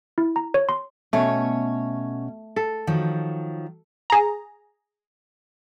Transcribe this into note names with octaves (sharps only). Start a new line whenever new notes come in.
E4
A#5
C#5
C6
B2 A3 C#4 C#5
A4
D#3 F3 F#3
G#4 A#5